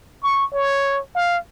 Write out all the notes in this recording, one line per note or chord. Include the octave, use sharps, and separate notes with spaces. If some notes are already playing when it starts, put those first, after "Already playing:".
C#6
C#5
F5